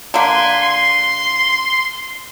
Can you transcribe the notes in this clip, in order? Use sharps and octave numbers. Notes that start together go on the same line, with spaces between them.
D3 A#3 B4 G#5 C6
C6